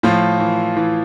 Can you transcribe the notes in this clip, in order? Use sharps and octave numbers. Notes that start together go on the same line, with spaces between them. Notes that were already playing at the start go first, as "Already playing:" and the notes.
A2 F3 F4
E3
E3